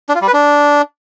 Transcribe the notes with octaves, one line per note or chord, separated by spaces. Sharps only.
D4
F4
G3
B4
D4